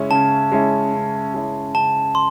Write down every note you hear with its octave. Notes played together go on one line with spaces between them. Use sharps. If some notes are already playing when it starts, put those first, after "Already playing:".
Already playing: C#3 G#3 C#4 E4
C#3 A5
G#3 C#4 E4
C#3
G#3 C#4 E4
C#3 A5
C6